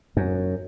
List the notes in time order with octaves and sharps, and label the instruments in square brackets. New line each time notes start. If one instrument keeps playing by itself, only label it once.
[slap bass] F#2